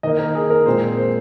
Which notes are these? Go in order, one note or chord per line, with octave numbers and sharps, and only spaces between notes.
D#3 A#3 D#5
A#4
G#4
A#4
A#2 G#3 C4 C5
A#4
C5